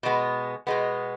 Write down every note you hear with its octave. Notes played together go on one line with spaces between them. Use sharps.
B2 G#3 B3
B2 G#3 B3